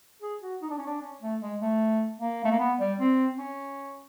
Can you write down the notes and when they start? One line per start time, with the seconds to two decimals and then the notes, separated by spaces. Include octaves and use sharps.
0.22 G#4
0.42 F#4
0.62 D#4
0.70 D4
0.78 C#4
0.86 D4
1.01 C#4
1.21 A3
1.41 G#3
1.61 A3
2.20 A#3
2.44 A3
2.51 A#3
2.59 B3
2.79 G3
2.99 C4
3.38 C#4